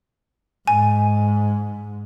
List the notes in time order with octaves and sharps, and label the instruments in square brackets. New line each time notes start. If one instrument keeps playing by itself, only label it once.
[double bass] G#2 [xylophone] G#5